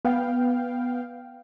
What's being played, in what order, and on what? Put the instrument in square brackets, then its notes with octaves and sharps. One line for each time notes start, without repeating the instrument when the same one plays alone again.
[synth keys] B3 F5 G5